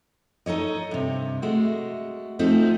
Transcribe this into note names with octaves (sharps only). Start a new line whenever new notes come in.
D#4 A4 C#5 D#5
G2 C3
G#3 A3 F#4
F3 A3 C4 D#4 F#4